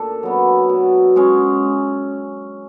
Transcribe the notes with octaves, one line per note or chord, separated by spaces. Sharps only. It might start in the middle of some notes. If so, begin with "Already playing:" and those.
Already playing: A#2 D4 A4
F#3 B3 D4
B2
G#3 C#4